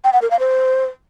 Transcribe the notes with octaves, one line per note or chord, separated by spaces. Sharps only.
G5
F#5
A#4
F5
C5